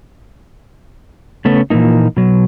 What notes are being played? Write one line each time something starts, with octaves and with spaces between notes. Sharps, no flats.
C#3 A3 B3 C#4
A#2 E3 F3 A#3 D#4
B2 F#3